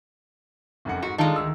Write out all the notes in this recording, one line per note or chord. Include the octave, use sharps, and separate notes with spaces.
F1 F#2 F#5
G#2 F#4
D#3 G#3 D4 D#4 F4 A4
D2 E6